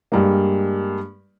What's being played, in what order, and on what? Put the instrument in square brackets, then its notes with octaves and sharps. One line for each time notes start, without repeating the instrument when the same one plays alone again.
[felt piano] G2 G3 G#3 A#3